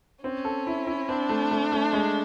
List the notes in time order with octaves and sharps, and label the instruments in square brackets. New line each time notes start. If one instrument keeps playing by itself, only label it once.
[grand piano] C4 [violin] C#4
[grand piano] A4
E4
E4
[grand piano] C4 [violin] D4
[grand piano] A3
A3
A3
G#3